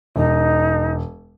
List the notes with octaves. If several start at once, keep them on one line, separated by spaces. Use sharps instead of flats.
E1 D#4